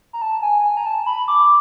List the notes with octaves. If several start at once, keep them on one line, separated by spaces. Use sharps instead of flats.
A#5
A5
G#5
G#5
A#5
A5
B5
D6